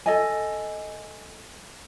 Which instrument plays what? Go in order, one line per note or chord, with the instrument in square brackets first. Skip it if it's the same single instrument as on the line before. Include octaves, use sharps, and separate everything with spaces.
[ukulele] A4 D#5 G#5